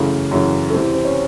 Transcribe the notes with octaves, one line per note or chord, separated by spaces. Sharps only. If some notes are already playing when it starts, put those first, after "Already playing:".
Already playing: F#2 C#3 E3 A3
F#2 C#3 E3
A3
E2 C3 E3 C4
C4
C#4